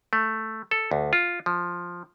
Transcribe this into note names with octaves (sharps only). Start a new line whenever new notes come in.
A3
A4
D2
F4
F3